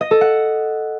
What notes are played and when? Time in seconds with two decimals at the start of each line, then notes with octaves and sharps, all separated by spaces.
0.01 D#5
0.11 A4
0.21 F#5